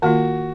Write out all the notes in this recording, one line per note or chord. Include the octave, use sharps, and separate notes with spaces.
D#3 A#3 F4 F#4